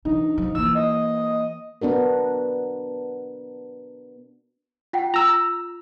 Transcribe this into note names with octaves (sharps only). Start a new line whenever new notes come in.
E3 D4 D#4
F3
E3 A#3 E6
D#5
B3 D4 F#4 A#4
F4 F#5 G5
F4 A#5 E6